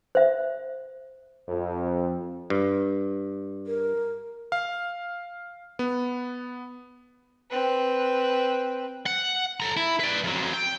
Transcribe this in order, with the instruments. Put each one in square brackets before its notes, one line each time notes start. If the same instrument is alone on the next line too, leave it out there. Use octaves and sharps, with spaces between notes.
[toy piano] C5 E5
[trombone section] F2
[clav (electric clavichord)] G2
[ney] A#4
[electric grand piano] F5
B3
[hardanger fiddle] C4 B4
[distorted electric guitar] F#5
A4 A#5
E4
B4 D5
F2 F#3
G5